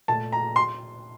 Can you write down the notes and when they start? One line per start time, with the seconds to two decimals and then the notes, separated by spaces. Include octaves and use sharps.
0.08 A#2 A3 A5
0.32 A#5
0.56 C6